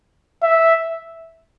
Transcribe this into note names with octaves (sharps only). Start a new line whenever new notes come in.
E5